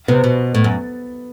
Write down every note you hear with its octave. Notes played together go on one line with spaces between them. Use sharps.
C3 B3
B2
A2
F#2